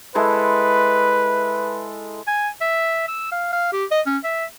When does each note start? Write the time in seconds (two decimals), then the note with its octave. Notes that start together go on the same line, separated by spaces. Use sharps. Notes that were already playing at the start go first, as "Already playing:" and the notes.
0.15 G#3 E4 A4 B4
2.27 G#5
2.61 E5
3.08 E6
3.32 F5
3.53 F5
3.73 G4
3.91 D#5
4.06 C#4
4.24 E5